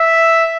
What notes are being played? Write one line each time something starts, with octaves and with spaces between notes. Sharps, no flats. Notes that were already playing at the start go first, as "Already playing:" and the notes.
Already playing: E5